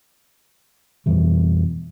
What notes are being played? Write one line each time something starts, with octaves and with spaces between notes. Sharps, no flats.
F2 B2 E3 G3